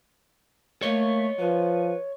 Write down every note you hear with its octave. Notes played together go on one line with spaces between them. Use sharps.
A3 A#3 C#5 D#5
F3 B4